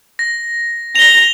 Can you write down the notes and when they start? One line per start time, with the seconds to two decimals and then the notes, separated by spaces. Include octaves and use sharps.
0.19 A#6
0.96 A#6 F7 G7